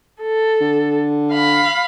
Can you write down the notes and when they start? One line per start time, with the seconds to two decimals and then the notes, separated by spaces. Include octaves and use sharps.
0.22 A4
0.61 D3
1.31 F5 B5